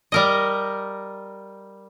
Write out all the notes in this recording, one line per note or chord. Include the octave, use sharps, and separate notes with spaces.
G3 A#4 D#5